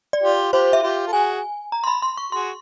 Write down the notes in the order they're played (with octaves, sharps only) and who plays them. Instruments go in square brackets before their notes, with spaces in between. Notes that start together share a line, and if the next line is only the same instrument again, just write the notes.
[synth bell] D5
[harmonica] F4 G4
[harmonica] F4 G4 [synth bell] C5
[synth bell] E5
[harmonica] F4 G4
A4
[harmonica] F#4 G#4 [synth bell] G#5
[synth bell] A#5
C6
B5
C6
C#6
[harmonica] F#4 G#4 [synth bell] C6